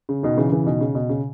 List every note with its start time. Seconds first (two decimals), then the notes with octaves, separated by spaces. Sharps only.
0.09 C#3
0.23 B2 D#3
0.37 C#3 E3
0.52 C#3 E3
0.66 B2 D#3
0.81 C#3
0.95 B2
1.09 C#3